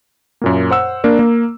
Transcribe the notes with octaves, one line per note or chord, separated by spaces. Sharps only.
F#2 A#2 A#3
C5 F#5 E6
A#3 D4 A#4
A#3